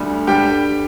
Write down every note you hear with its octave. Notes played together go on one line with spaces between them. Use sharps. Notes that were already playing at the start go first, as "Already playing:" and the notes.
Already playing: D2 D3 G3
G2 D3 G3 G4 G5